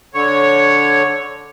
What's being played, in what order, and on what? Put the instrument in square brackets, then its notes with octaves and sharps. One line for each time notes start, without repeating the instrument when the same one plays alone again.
[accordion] D3 C#5